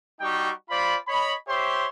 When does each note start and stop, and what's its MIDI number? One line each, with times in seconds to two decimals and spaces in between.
0.21 0.51 55
0.21 0.51 63
0.21 0.51 66
0.21 0.51 79
0.21 0.51 85
0.70 0.96 65
0.70 0.96 72
0.70 0.96 74
0.70 0.96 83
1.08 1.34 73
1.08 1.34 75
1.08 1.34 83
1.48 1.87 67
1.48 1.87 72
1.48 1.87 73
1.48 1.87 76
1.48 1.87 84